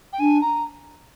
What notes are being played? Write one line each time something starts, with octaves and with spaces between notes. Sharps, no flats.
G5
D4 G#5
A#5